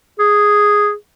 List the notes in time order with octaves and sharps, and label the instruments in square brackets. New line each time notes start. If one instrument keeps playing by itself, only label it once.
[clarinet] G#4